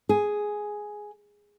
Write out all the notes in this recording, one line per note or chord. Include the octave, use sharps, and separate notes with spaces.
G#4